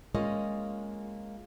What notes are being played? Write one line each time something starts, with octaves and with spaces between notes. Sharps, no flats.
G#3 A#3 C#4 F4 D#5